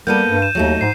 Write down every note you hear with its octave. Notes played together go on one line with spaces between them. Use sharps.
G3 A#3 B3 A4 G6 D#7
G2
E7
D#2 F#3 A3 D#4
G#2 C7